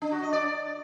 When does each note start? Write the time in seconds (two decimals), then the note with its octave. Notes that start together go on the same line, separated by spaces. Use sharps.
0.02 D4
0.12 F#4
0.22 D#5
0.33 D5